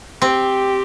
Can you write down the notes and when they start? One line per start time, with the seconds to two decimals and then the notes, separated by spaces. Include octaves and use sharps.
0.22 C4 G4